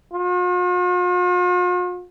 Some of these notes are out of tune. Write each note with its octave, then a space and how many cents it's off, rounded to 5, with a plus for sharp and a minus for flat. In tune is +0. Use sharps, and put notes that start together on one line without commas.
F4 +45